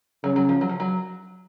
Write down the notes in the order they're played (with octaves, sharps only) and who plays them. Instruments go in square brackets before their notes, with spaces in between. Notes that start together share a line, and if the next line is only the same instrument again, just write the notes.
[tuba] C#3 [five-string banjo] F#3
[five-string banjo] F#3
F3
F#3
F3
F#3